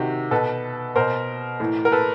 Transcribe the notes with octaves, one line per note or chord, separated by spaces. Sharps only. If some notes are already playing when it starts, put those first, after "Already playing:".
Already playing: C3 D#3 F#4 G4
B2 A4 B4
B2 A#4 C5
A2 E3
A#4
A4 B4